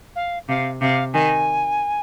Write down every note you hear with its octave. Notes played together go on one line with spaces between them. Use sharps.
F5
C3 F5
C3 F5
D#3 G#5